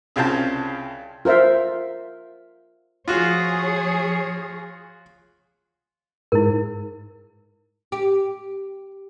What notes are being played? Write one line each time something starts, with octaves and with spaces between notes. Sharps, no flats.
C2 C#3 C4 F4 G5 A5
F4 A#4 C5 E5
F3 F4 F#4 G#4 C#5
G#2 E4 A#4
G4